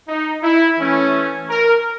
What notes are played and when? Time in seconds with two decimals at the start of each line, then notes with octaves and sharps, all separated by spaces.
0.09 D#4
0.43 E4
0.78 E3 A3 C#4
1.49 A#4